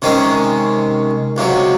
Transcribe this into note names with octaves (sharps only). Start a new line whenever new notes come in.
C3 D#3 G#3 C#4
C#2 C3 F#3